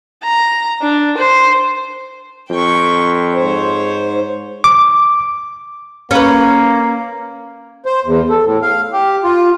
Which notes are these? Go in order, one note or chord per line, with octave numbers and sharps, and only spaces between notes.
A#5
D4
C5
F2 G5 C#6
G#2 C5 C#5
D6
A#3 C#4 B4
C5
E2
A4
A2
F5
G4
F4